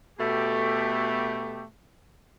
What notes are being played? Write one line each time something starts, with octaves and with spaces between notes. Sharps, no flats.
B2 A3 G4